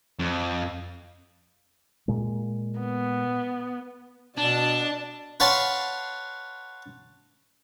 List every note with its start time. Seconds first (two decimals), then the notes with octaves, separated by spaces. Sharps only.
0.19 F2
2.08 A#2 G#3
2.80 B3
4.38 B2 D4 D5 A5
5.40 B4 C#5 F5 F#5 A5 C6